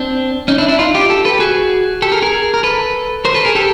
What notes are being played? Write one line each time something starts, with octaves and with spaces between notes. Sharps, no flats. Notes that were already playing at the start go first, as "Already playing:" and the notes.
Already playing: C4 D4
C#4 D#4
D4 E4
D4 E4
D#4 F4
F4 G4
G4 A4
A4 B4
G4
F#4 G#4
G4 A4
G#4 A#4
G#4 A#4
A#4
A4 B4
A#4 C5
A4 B4
G#4 A#4
G4 A4